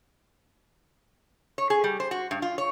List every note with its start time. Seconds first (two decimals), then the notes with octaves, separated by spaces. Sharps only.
1.58 C#5
1.70 G#4
1.84 G3
2.00 C5
2.11 F#4
2.31 G2
2.42 F4
2.58 C#5